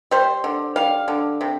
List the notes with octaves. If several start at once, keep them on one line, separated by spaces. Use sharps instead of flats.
G3 C5
D3
G3 F5
D3
C3